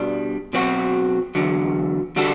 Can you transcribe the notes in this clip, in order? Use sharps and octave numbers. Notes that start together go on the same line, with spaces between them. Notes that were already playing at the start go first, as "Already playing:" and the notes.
Already playing: B2 G3 D4
B2 F#3 C4 F#4
E2 D3 F#3
D3 G3 D4 F#4 A4